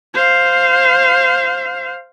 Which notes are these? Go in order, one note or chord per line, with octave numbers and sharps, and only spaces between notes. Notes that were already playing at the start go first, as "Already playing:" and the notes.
C5 F5